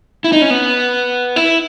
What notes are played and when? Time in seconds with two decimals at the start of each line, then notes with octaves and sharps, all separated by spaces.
0.24 E4
0.32 D#4
0.42 C#4
0.50 B3
1.36 E4